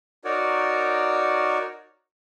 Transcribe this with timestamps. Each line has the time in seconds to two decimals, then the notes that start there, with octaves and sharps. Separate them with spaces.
0.25 D#4 F#4 A#4 C#5 D5